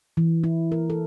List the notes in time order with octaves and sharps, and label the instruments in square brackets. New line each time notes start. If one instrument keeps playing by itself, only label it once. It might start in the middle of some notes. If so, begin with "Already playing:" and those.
[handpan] E3
E4
A#4
A4